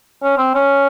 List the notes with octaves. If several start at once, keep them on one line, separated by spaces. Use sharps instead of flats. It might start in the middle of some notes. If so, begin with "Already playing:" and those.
C#4
C4
C#4